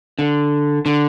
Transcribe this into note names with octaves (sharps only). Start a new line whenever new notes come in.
D3
D3